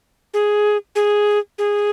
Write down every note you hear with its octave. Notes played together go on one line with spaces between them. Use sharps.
G#4
G#4
G#4